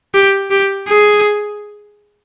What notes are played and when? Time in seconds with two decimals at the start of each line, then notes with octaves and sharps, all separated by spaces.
0.14 G4
0.51 G4
0.88 G#4